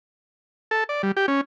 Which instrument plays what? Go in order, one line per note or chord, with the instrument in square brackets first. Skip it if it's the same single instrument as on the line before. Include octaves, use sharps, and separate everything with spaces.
[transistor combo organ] A4
D5
G3
G4
C#4